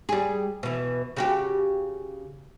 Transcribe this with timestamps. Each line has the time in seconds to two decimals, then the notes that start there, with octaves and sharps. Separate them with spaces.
0.09 G3 G#4
0.63 B2 E3
1.16 C#3 F#4 G4